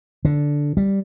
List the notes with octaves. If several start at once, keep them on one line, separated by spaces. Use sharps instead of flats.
D3
G3